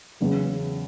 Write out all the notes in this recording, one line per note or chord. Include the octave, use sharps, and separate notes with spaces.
E2 C#3 F#3